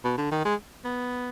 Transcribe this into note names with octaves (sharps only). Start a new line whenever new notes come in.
B2
D3
D#3
G#3
B3